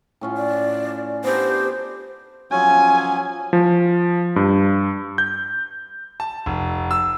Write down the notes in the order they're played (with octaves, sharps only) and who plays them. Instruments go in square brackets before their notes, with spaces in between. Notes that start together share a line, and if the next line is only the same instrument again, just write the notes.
[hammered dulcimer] A2 C#4 F4
[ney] D5
[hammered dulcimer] B3 D4 G4 [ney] C5
[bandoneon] F3 F#3 C#4 [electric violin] G#5
[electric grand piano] F3
G2
G6
[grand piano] A5
F1
E6